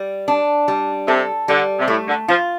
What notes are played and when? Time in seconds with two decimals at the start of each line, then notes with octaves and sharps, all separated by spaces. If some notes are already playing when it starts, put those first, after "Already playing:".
Already playing: G3
0.28 D4
0.68 G3
1.08 C3 A4
1.48 D3 G3
1.79 C3
1.88 A2 A3
2.08 D3
2.28 F3 F4